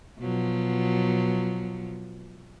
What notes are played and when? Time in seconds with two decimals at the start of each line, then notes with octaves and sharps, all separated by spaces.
0.20 B2 F3 F#3